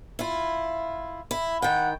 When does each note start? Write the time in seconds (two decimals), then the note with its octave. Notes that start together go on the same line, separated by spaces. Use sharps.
0.19 E4 F4
1.31 E4
1.62 D#3 F#5 G5